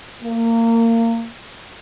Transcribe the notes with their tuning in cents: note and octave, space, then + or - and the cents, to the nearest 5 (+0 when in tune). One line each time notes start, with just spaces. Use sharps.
A#3 -25